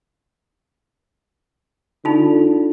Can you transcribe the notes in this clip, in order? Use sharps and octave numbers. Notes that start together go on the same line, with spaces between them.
D3 D#4 F4